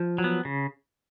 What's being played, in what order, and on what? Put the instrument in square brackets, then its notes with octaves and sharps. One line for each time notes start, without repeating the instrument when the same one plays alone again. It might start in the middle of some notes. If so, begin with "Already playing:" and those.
Already playing: [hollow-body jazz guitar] F3
[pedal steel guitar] F#3
B3
C#3